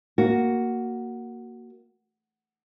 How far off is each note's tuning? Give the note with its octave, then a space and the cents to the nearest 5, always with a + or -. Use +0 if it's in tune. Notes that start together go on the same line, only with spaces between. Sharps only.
A#3 +0 F#4 +5